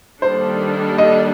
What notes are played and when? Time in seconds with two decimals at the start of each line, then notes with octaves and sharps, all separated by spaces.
0.22 D#3 G3 A#3 D4 A4 C5
0.98 D#5